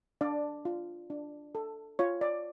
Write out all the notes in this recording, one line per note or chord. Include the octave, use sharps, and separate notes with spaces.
D4 D5
F4
D4
A4
F4 C#5
D5